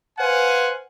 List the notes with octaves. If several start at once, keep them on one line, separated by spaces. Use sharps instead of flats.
B4 C5 F5 F#5 G#5